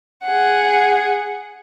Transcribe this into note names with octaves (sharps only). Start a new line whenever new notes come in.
G#4 F#5